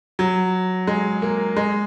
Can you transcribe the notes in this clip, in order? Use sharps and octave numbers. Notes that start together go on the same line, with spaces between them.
F#3
G#3
A#3
G#3